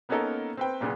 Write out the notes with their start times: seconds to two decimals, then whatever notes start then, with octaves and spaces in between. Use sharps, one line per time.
0.09 A#3 B3 C#4 D#4 A4 A#4
0.57 C4 B4 G5
0.81 B1 A#2 C#3 B3